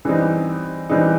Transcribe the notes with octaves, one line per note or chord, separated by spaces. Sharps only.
E3 G3 C4 D#4
E3 G3 C4 D#4